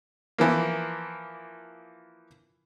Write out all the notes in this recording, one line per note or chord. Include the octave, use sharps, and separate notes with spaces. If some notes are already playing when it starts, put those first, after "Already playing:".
E3 F3 A#3